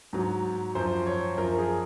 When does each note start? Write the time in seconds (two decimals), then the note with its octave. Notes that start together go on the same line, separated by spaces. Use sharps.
0.13 G#2 F#3
0.75 F#2 F3 C5
1.06 C#5
1.38 F#2 F3 A#4
1.58 G#4